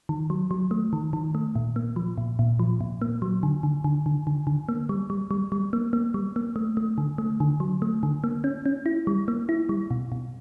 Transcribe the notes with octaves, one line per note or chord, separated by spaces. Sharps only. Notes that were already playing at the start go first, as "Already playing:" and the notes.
D#3
F#3
F#3
A3
D#3
D#3
A3
A#2
A#3
F3
A#2
A#2
F3
A#2
A#3
F#3
D3
D3
D3
D3
D3
D3
A#3
G3
G3
G3
G3
A#3
A#3
G3
A#3
A3
A3
D3
A3
D3
F#3
A3
D3
A#3
C#4
C#4
E4
G3
A#3
E4
G3
B2
B2